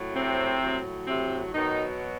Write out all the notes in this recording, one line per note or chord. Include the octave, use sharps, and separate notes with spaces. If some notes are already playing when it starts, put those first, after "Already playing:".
Already playing: A2 F#3
C3 C4
A2 F#3
C3 C4
B2 D#3 F#3 D#4